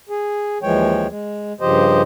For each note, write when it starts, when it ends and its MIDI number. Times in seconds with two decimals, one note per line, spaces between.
0.09 0.58 68
0.63 1.07 39
0.63 1.07 52
0.63 1.07 53
0.63 1.07 56
0.63 1.07 73
0.63 1.07 79
1.09 1.53 56
1.61 2.02 43
1.61 2.02 49
1.61 2.02 53
1.61 2.02 67
1.61 2.02 72
1.61 2.02 75